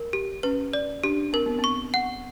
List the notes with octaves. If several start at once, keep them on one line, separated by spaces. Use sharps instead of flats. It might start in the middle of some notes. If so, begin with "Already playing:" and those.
Already playing: A#4
G4
C#4 B4
D5
D4 G4
C4 A#4
B3
C4
C#6
F#5